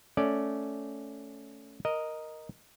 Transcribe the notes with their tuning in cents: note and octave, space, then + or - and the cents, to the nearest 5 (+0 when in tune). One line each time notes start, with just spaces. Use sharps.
A3 +0 C#4 +5 D5 +0
A#4 +0 D#5 +0